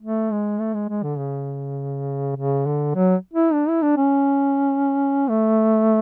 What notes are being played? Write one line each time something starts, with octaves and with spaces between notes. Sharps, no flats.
A3
G#3
A3
G#3
G#3
D3
C#3
C#3
D3
F#3
E4
D4
E4
D4
C#4
A3